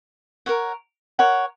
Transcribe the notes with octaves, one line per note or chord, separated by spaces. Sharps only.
A#4 C#5 F#5
A#4 C#5 F#5